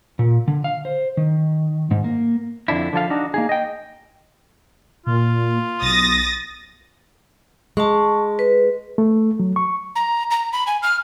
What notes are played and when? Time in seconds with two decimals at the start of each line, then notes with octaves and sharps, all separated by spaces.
0.19 A#2
0.48 D3
0.64 F5
0.85 C5
1.17 D#3
1.91 G#2
2.04 A#3
2.68 F2 D3 D4 E4
2.93 D3 F3 A4 F5
3.10 D4 D#4 F#4
3.34 A#3 D#4 G#4
3.49 D#5 G5
5.07 A#2 F4
5.81 B1 D#6 A6 A#6
7.77 G#3 A5 C#6
8.39 B4
8.98 A3
9.40 F#3
9.56 C#6
9.96 A#5
10.31 A#5
10.53 B5
10.67 G#5
10.83 F6